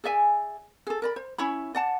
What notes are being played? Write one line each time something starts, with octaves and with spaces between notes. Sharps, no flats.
G#4 D5 E5 G#5
G#4 A4
A#4 D5 B5
C5
C#4 E4 C#5 B5
D5 F#5 A5